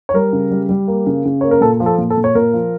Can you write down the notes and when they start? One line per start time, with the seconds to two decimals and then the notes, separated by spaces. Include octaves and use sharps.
0.09 C#5
0.14 G3 A#4
0.33 C#3
0.51 G3
0.69 G3
0.88 A#3
1.07 C#3
1.25 C#3
1.41 A#3 C#5
1.51 A#4
1.61 A#2 A4
1.80 F3
1.86 A4
1.98 A#2
2.10 A4
2.17 A#2
2.24 C#5
2.35 A#2 A#4
2.53 F3